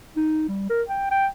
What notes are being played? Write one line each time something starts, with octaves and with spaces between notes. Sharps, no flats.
D#4
G3
A#4
G5
G5